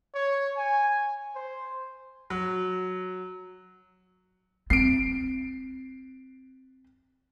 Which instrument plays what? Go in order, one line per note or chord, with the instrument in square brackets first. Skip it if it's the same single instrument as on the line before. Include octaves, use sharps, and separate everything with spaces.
[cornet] C#5
G#5
C5
[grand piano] F#3
[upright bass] C4 [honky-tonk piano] C7 D7